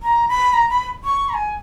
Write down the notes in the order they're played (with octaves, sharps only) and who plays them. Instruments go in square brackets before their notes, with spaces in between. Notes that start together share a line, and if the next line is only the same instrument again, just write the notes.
[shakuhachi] A#5
B5
A#5
B5
C#6
A#5
G#5